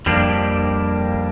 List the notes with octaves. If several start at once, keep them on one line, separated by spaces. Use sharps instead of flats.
F2 G3 A#3 D4